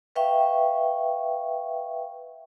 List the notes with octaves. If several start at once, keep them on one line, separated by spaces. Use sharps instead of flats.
B4 E5 F5 G5 C#6